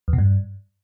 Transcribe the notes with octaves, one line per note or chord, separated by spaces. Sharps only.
E2
B2
G2